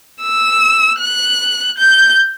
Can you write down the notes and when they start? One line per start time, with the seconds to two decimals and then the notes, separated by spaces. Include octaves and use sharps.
0.22 E6
1.00 F#6
1.78 G6